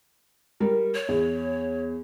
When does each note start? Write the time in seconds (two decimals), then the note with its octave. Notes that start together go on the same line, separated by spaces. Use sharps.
0.60 G3 A#4
0.95 C#5
1.08 E2